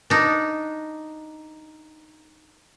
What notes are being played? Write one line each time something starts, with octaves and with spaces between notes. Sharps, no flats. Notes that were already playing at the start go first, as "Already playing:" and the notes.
D4 D#4